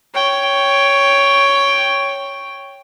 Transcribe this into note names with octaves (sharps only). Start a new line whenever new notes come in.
C#5 G5